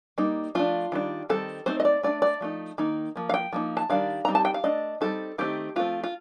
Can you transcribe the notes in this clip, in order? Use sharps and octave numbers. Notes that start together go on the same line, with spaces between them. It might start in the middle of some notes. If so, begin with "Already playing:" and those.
G3 A#3 D#4
F3 A3 D4 F4
D#3 G3 D4
D#3 G3 C4 D#4 A4
A3 C4 D#4 C5
D#5
D5
A3 D4 D5
D5
F3 A3 D#4
D#3 A#3 D#4
F3 A#3
F5
G5
F3 A#3 D#4
A5
D#3 G3 D4 F5
G3 C4 D#4 A#5
A5
G5
F5
A3 D4 D#5
G3 C4 D#4 A4
D#3 A3 C4 D#4 G4
F3 A3 C4 F4
F4